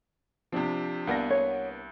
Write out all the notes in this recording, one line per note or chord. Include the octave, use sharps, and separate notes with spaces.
C3 F3 C4 D4 G4
C2 A#3 B3 D4 A#6
C#5